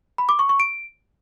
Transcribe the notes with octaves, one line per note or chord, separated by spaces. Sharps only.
B5
D6
C#6
C#6
D7